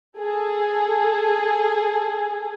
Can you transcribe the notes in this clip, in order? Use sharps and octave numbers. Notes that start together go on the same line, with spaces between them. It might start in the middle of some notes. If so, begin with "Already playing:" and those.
G#4 A4